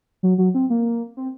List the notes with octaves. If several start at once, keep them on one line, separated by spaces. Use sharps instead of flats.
F#3
F#3
C4
A#3
C4